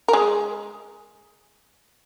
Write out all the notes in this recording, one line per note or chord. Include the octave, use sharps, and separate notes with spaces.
A#4
G#3 G#4